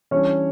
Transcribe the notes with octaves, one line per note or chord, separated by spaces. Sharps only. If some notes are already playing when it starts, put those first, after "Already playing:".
E3 G3 C#4 D4 C#5